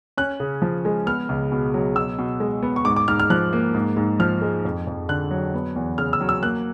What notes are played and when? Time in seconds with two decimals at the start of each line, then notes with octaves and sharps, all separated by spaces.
0.17 C#4 F#6
0.40 C#3
0.62 F3
0.85 G#3
1.06 B3 F6
1.29 C#2
1.52 B2
1.74 F#3
1.96 B2 E6
2.19 B2
2.40 G#3
2.63 B3
2.76 C#6
2.85 G#2 D6
2.96 D6
3.08 G#2 F6
3.20 F6
3.30 F3 F#6
3.53 A#3
3.75 G#2
3.97 G#2
4.19 F3 F6
4.41 G#3
4.65 F2
4.87 F2
5.09 D3 F#6
5.31 F#3
5.54 B3
5.76 E2
5.98 C#3 F6
6.13 E6
6.21 F#3
6.29 E6
6.42 A#3 F#6